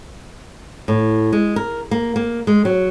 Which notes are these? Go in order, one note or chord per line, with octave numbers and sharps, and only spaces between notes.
A2
G#3
A#4
A#3
A#3
G#3
F#3